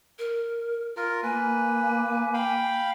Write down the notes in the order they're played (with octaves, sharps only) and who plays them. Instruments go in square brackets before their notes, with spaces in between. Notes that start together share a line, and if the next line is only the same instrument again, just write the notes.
[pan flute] A#4
[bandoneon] F4 A#4 [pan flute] F6
[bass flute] A#3 [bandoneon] B4 [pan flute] G#5
[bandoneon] F5 G5 B5